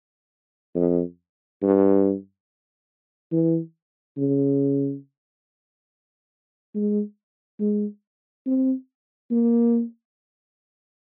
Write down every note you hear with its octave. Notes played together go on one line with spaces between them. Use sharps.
F2
G2
E3
C#3
G#3
G#3
C4
A#3